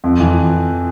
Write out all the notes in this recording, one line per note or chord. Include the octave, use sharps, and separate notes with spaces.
F2
E3